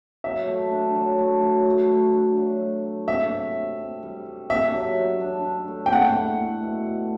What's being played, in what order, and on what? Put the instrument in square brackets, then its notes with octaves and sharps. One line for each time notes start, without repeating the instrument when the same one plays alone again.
[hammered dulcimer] F#3 [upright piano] E5
[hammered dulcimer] A3
D4
F#3
A3
F#3
A3
A3
D4
F#3
A3
F#3
[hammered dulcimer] D4 [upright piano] E5
[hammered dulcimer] C3
D4
C3
G3
G3
[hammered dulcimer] D4 [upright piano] E5
[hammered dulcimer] F#3
F#3
D4
D4
A3
[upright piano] G5
[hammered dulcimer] E4 [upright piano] F#5
[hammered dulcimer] A3
A3
B2
A3